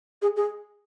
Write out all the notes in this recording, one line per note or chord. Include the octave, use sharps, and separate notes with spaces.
G#4
G#4